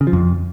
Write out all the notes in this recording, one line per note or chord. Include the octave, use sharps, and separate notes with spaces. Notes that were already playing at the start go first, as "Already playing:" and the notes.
C#3
F3
F2